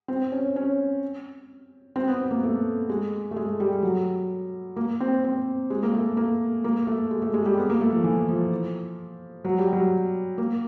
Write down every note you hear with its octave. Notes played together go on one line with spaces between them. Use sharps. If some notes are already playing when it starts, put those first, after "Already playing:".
C4
C#4
C#4
C4
B3
B3
A#3
A3
G#3
A3
G#3
G3
F#3
A#3
C4
C4
G#3
A#3
A3
A#3
A#3
A3
G#3
A3
G#3
G3
B3
A#3
A3
F3
E3
F3
F#3
G3
F#3
A#3